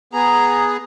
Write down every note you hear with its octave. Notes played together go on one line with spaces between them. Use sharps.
B3 G#4 A#5